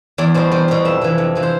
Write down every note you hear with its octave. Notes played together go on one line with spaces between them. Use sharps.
E2 D5
B2 G3 C5
E2 C5
B2 G3
F2 E5
C3 E3
F2
C3 E3
C5